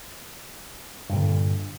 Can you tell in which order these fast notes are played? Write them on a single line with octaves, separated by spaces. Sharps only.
G2 A#2 D3